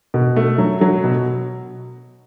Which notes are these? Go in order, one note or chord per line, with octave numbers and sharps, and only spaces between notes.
B2
A3
F#3
F#3
B2